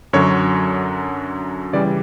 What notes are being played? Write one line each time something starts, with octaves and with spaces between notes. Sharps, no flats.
F#2 D3 F#3 C#5
C#3 E3 G3 D5